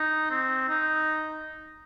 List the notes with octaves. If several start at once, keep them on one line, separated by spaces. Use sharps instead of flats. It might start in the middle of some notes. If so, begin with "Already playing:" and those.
Already playing: D#4
C4
D#4